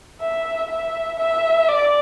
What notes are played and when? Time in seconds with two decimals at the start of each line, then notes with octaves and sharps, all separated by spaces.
0.21 E5
0.70 E5
1.19 E5
1.68 D5